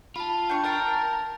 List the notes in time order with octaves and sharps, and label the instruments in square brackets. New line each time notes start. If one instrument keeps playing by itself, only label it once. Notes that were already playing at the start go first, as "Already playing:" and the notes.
[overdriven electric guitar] F4 [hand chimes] A5 B5
[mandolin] D4 C#6 [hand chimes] G5 G6
[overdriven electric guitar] A#4 [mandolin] G5 A5 [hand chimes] F6